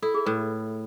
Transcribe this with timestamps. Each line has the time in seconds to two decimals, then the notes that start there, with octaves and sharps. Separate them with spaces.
0.02 E4 A4
0.14 G#4
0.26 A2 B4